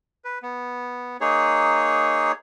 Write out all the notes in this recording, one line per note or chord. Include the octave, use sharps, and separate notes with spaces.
B4
B3
A#3 D#4 G#4 C#5